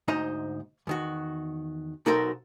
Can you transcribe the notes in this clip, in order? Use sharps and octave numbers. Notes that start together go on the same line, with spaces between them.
D2 G#2 D#4 C5 D#5 A#5
E2 D#3 F#4
B1 D#4 F#4 A4 A#4 C5